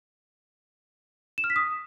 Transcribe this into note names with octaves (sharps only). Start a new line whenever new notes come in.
E7
F6
B6
D#6